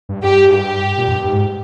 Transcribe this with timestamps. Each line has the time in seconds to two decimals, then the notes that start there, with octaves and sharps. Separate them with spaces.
0.09 G2
0.23 G2 G4
0.48 G#2
0.53 G2 G4
0.98 A#2
1.08 E2
1.13 G2
1.27 G#2